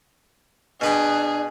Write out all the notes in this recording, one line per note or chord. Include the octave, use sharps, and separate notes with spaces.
B2 D4 G#4 B4 G5